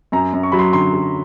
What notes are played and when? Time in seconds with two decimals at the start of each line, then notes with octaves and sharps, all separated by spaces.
0.12 F#2 A#5
0.33 F#2
0.43 C#6
0.52 F#3 B5
0.59 C6
0.73 D3 C6
0.93 F#3